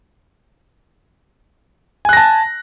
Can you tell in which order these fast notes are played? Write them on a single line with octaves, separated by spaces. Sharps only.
G#5 F#6 A#6 A5